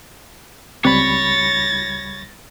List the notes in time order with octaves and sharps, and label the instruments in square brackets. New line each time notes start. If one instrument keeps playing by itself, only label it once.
[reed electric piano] C#2 G3 B5 [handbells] C4 [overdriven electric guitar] C#5 [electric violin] A6 A#6